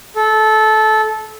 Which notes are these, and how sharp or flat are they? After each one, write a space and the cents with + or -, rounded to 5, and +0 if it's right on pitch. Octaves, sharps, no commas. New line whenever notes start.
A4 -20